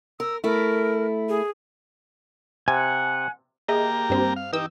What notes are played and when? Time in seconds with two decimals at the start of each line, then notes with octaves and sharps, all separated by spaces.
0.20 A#4 E6
0.44 A3 E4 A#4
1.29 G#4
2.68 C3 F#5 G#5
3.69 A#3 G4 G#4 D#5 E5 A#5
4.10 G2 G3 C4
4.36 F5
4.53 E3 D#4 G4 E6